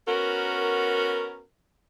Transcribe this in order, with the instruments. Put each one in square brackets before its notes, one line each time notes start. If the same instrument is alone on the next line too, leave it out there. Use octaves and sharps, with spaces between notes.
[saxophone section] B3 C#4 F#4 A#4